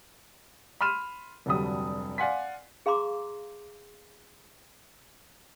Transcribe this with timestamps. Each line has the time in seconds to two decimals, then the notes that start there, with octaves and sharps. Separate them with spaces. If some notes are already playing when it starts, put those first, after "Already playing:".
0.81 B5 C6 F6 D#7 E7
1.46 F1 D2 D3 F#3 G3 D#6
2.18 D5 F5 F#5 G#5 C6 B6
2.86 G#4 F5 A#5 C6 D6